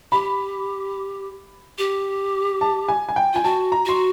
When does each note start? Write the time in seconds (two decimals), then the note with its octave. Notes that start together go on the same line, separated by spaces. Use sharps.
0.12 G4 B5
1.78 G4
2.61 A5
2.89 G#5
3.09 G#5
3.16 G5
3.33 F4 G#5
3.44 F#4 A5
3.72 A#5
3.86 F#4 C6